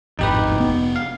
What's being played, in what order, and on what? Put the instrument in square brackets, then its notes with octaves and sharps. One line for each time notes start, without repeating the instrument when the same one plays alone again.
[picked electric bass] D1 G#1 F2 [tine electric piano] D#4 G4 B4
[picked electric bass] F1 B3
[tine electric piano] F5